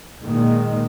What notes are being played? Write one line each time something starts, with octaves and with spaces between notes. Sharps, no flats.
A#2 D#3 G#3